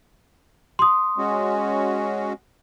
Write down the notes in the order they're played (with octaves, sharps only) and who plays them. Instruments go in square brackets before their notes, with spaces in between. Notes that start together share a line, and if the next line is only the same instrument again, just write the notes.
[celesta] C6 D#6
[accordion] G#3 C#4 F#4